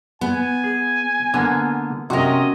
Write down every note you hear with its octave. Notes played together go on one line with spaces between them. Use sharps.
B3 G#5
G#4
D3 A#3 B3
C3 C#4 F#4 A#4 D#5